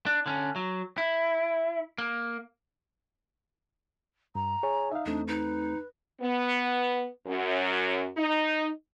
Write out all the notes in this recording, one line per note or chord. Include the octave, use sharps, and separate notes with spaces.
D4
D3 C#4
F#3
E4
A#3
G2 A#5
G#4 C#5 G#5
D#4 E5 F5
E2 A3 C4 D4
D#4 B4
B3
F#2
D#4